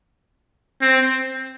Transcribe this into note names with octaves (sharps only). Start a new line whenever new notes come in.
C4